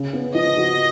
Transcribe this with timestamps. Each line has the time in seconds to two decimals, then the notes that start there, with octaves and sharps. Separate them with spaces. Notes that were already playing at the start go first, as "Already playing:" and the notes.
Already playing: C#3
0.13 B3
0.35 F3 D#5
0.57 F#4